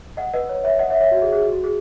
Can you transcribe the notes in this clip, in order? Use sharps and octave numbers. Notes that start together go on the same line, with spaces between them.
D#5 F#5
B4 D#5
C#5
C#5 E5
D#5 F#5
C#5 E5
C#5 E5
F#4
G#4
G#4
F#4
F#4
G#4